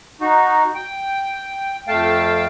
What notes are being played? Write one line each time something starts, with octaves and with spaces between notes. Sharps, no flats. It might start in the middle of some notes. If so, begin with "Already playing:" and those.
D#4 F#4
G5
F2 A3 F5 G5 A5